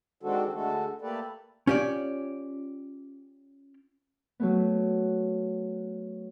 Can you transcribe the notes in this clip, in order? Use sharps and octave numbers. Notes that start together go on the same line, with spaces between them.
D#3 G#3 C4 D4 F#4 A4
D3 G#3 A3 F#4 A4
A3 A#3 G4 A4 B4 D5
C#4 F4 G4 C#5 D5
F#3 A3 B3